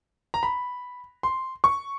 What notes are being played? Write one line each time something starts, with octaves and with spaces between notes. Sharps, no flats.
A#5
B5
C6
C#6